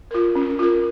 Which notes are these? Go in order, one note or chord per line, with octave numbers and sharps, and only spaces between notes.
F4 A#4
C#4
F4 A#4